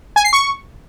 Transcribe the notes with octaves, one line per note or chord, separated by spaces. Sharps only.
G#5
C7
C#6